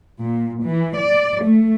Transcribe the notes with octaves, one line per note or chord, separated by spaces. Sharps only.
A#2
E3
D5
A3